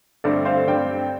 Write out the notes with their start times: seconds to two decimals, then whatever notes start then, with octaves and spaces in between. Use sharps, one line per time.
0.24 G2 D3 A3 C4 A4 D5
0.45 C5 F5
0.67 G2 G3 C4 D5 G5